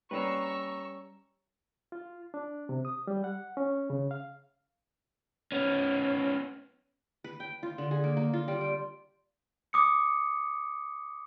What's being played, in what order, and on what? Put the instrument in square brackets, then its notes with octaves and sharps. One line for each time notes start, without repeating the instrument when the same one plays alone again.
[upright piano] G3 C#4 [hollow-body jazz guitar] A#3 B4 [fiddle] A#5 E6 [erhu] C#6
[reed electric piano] F4
D4
C3
D#6
G3
F#5
C#4
C#3
F5
[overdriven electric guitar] B3 C#4
[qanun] B4
G5
F4
D3
G#4
A#3
A#3
F4
G3
G5
[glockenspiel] D6 D#6 C#7